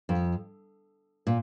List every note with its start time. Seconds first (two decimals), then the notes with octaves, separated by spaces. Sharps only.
0.09 F2
1.27 A#2